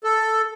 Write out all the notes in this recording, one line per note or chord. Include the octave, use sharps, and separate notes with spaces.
A4